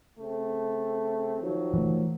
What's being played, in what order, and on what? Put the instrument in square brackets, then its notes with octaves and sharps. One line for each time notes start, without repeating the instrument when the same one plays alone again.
[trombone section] C#3 A3 C4
D#3 F3 F#3
[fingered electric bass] E3 A3